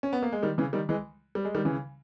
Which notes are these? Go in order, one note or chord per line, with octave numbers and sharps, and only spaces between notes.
C#4
B3
A#3
G#3
D#3 G3
C#3 E3
D#3 G3
E3 G#3
G3
G#3
D#3 G3
C#3 E3